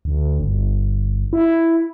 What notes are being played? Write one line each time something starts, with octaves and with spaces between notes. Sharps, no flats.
D2
G1
E4